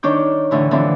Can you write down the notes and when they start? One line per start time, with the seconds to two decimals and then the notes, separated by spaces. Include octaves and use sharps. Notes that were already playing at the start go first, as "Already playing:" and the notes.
0.03 D#3 D4 C#5 D6 G6
0.51 A2 D3 E3
0.71 D3 E3 F3 C4 D4